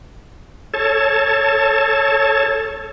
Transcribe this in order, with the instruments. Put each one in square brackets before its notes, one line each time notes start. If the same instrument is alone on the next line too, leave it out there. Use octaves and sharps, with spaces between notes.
[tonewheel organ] A4 C#5 A5